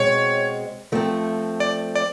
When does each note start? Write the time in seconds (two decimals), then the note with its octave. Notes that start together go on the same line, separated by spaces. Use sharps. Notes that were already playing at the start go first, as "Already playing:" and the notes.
Already playing: B2 G#3 C4 C#5
0.92 F3 A3 C4
1.60 D5
1.95 D5